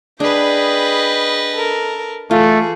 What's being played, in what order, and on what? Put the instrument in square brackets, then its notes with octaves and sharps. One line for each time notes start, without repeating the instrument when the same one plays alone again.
[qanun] D4 [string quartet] G#4 G5 B5 [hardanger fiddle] B4 D#5
[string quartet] A4 A#4
[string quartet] E3 G#4 A4 [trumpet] A3 [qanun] F4